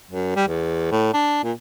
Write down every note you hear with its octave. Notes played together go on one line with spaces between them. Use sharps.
F#2
G3
E2
A2
D4
A#2